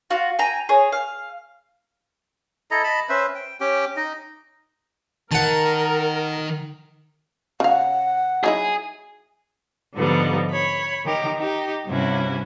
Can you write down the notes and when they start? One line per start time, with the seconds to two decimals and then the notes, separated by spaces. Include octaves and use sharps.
0.10 F4 F#4
0.39 G5 G#5 A#5
0.69 G#4 C#5
0.92 F5
2.71 E4 A4 D#5 A#5
2.84 D#5 A5 B5
3.09 C#4 B4 C5 E5
3.35 G5
3.60 C#4 G4 G5
3.97 D#4 D#5
5.31 D#3 A#4 F#5 A5
7.60 C#3 F5 F#5
8.44 F#3 D#4 E4 G#4
9.95 G#2 D3 F3 G3 B3 D#4
10.51 C#5 B5
11.05 D#3 G4 A#4
11.38 D#4 G4
11.87 G2 C3 C#4 E4 F#4